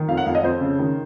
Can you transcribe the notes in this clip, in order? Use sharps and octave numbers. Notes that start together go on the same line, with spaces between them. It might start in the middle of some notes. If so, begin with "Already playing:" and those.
Already playing: D#3
F2 F5
F#5
F2 F5
D#5
F2 C5
C#3
D#3